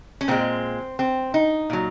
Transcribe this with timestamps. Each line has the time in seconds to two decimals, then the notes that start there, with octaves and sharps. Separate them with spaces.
0.21 C#4
0.28 A#2 G#3 C4
0.99 C4
1.34 D#4
1.70 A#2 F#3